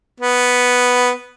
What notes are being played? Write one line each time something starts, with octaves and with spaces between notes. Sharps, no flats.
B3